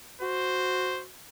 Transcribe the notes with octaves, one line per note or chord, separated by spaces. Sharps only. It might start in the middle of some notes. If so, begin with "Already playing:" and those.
F#4 C5